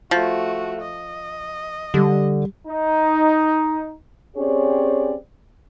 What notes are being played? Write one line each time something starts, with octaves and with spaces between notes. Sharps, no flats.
F3 A3 F#4
D#5
D3 G3
D#4
C4 C#4 G4 G#4 C#5 D5